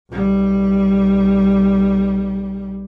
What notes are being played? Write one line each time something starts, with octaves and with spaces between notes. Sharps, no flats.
B1 G3